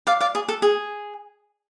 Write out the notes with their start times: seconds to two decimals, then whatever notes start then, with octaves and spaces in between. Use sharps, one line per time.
0.07 D5 F5
0.20 D5 F5
0.35 G#4
0.48 A4
0.62 G#4